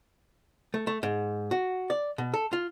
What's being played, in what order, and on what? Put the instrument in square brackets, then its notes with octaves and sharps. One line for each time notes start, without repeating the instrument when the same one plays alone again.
[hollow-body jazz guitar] A3
A3
G#2
F#4
D5
B2
A4
F4